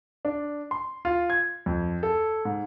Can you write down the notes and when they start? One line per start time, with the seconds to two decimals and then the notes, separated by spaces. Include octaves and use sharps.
0.25 D4
0.71 C6
1.05 F4
1.30 G#6
1.66 F2
2.03 A4
2.45 G#2